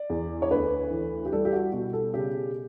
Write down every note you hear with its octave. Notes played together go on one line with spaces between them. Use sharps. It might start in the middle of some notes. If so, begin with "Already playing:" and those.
Already playing: D5
E2
C#5
D2 B4
E3
G4
G3 A4
G4
F#4
B2 F#4
A4
C#3 G4